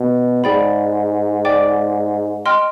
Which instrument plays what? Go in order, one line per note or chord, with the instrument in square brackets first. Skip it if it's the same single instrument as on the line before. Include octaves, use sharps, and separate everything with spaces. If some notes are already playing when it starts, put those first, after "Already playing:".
Already playing: [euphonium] B2
[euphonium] G#2 [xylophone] G#4 D5 G5 B5
[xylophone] D5 G5 D6
D#5 G5 C6 F6